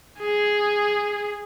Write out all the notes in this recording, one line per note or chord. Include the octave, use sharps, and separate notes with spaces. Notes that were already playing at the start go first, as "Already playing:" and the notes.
G#4